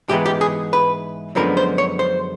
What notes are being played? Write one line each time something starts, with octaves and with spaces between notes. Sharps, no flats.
G#2 E3 G#3 B3 G4
G4
G#4
B4
F#2 D3 F3 G#3 B3 A#4
C5
C#5
C5